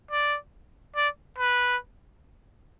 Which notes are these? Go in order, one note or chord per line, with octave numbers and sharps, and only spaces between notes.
D5
D5
B4